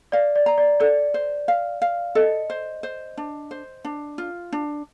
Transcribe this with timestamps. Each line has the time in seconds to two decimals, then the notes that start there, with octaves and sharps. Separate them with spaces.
0.12 D5 F5
0.36 D5
0.46 A#5
0.58 D5
0.80 A4 D5
1.14 C5
1.48 F5
1.82 F5
2.15 A4 D#5
2.50 C5
2.83 C5
3.17 D4
3.51 C5
3.85 D4
4.18 F4
4.53 D4